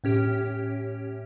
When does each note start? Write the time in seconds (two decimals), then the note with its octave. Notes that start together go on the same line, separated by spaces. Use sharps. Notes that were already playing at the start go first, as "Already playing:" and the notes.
0.04 A2 C#4 G4